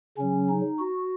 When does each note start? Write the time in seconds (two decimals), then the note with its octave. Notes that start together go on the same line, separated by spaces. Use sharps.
0.17 C#3 F#3 C#4
0.49 D#4
0.79 F#4